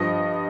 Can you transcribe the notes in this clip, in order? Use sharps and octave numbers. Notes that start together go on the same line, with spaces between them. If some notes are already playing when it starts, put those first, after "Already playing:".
Already playing: G2 F3 D#5